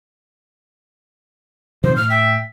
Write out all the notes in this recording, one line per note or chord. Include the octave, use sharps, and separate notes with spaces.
C3 D#3 F3 C5
A2 F6
E5 G5